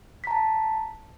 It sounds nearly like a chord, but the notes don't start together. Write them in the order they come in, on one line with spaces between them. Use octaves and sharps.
B6 A#5 A5